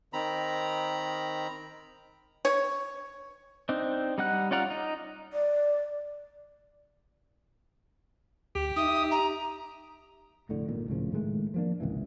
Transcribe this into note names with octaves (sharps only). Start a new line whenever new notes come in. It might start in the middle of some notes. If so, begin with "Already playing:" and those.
D#3 C4 A#5 B5
C#5
C4 D4 D#4
G3 D#4 F#5 F#6
C#4 F4 D5 F#5 A#5
D#4
D5
D2 G4
D#4 E5 D#6
A#5
F1 D2 A2 D3
G#1 A#2 D#3
C#2 A2 C#3 F3
A2 D#3 G#3 A3
F3 A#3 D4
G#1 C#2 C3 E3